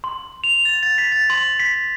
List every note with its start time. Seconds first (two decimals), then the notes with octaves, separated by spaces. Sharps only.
0.04 C6
0.44 F7
0.65 A6
0.83 A6
0.98 B6
1.12 A6
1.30 C6
1.59 B6